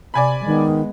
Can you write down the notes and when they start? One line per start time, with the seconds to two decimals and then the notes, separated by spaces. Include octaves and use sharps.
0.14 C3 D5 G#5 B5
0.46 D#3 G#3 B3